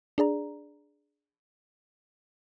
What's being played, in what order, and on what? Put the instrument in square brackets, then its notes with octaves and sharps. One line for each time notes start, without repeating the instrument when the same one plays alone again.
[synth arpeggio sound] D4 G#4 D5 A#5